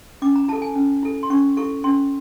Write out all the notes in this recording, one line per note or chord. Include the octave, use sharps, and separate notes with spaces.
C#4 D6
A#5
E4 A4 A5
G#5
C#4
E4 A4
C6
C#4 C#6
E4 A4 C#6
C#4 C6